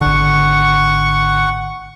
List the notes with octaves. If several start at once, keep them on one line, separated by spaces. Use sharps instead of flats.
G#1 D3 F#5 C#6